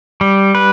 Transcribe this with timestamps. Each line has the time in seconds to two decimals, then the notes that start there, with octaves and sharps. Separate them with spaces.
0.21 G3
0.55 B4